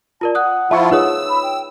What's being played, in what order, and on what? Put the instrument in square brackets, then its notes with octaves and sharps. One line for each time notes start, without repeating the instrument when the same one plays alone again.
[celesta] F4 A#4 D5 [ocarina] A5
[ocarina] F#5 [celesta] D#6 F#6
[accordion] F3 E4 F4 [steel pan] E5 C#6 [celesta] A5
[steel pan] D#4 F4 G#4 [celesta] B4 C#5 D#6 [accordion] E6
[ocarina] B5
G5